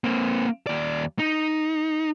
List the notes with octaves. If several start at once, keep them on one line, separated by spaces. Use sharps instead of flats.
A#3 C4
D#2 D5
D#4